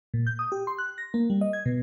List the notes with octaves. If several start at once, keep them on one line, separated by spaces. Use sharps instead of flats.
A#2
G6
D#6
G4
C6
F#6
A#6
A#3
G3
D#5
G#6
B2